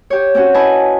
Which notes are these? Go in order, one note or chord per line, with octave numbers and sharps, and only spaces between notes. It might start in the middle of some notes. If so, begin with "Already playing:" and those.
G4 C#5
C4 C#4 F#4
E4 B4 D#5 G#5 A5